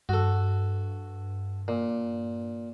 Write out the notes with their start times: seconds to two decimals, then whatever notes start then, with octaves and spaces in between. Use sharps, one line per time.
0.09 G2 F#4 A4
1.68 A#2